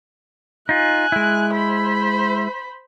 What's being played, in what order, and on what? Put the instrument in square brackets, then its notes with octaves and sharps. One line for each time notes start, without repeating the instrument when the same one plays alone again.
[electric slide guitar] D#4 F4 [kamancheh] G#5 F#6
[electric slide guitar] G#3 E4
[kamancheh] C5 B5